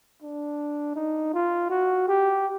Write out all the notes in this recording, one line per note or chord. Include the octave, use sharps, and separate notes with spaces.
D4
D#4
F4
F#4
G4